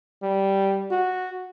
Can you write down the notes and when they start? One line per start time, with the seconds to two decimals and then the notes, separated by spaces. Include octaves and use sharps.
0.23 G3
0.91 F#4